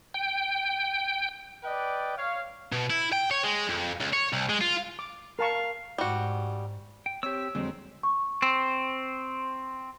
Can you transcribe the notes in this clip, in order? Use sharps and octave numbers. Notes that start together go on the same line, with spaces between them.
G5
B4 D5 D#5 G5
C#5 F5
B2
E4
G5
C#5
G#3
F2
C#2
C#5
C2
G#3
F4
D6
A#4 F5 A5 C#6
G#2 G3 F#4
G5
C4 G4 C#5 E6
F2 D3 F#3 G#3 C4
C#6
C4